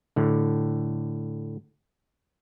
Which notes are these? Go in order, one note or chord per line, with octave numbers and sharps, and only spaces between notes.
A2 D3